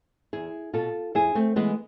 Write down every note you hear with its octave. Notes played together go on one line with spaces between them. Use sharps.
E2 E4 G#4
B2 F4 A4
F2 E4 G#4
A3 C4
E3 G#3 B3